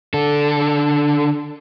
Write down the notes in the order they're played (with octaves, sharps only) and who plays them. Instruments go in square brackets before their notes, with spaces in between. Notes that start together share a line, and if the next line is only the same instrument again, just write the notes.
[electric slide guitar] D3 A4